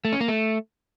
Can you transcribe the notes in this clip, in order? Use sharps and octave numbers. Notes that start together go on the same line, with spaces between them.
A3
C#4
A#3
A3